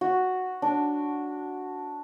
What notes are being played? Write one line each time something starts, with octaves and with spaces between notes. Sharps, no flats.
F#4
D4